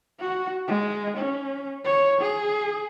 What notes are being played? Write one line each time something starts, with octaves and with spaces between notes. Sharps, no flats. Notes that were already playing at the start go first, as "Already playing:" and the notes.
F#4
G#3
C#4
C#5
G#4